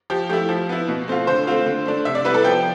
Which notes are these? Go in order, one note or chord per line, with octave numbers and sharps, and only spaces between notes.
F3 G4
A3 E4 G4
F3
B3 E4
B2
A3 C4 F4
D3 C5
A3 C4 F4
D3
A3 D4
C3 E5
D5
G3 B3 E4 B4
A4
F3 G5